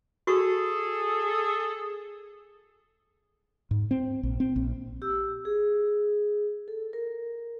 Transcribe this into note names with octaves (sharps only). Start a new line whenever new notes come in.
F#4 G#4 A4 C#6
G#2
C4
A#1
C4
A#1
G4 E6
G#4
A4
A#4